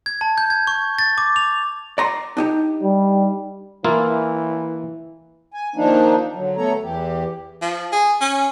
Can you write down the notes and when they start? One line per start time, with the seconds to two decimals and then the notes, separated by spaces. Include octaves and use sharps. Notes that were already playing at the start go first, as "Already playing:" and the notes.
0.06 G#6
0.21 A5
0.38 G6
0.50 G#6
0.67 C#6
0.99 A6
1.18 D6
1.36 F7
1.98 D5 A#5 C6
2.37 D4 D#4 G4
2.83 G3
3.84 E3 A#3 E4 F4
5.54 G#5
5.76 D#3 F3 A#3 D4 D#4
6.35 D3 F#3
6.57 A3 B3 A4 C#5 A#5
6.83 E2 E3 G4
7.62 F3
7.92 G#4
8.21 C#4